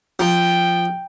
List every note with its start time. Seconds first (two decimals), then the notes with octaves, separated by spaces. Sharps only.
0.19 F3 G5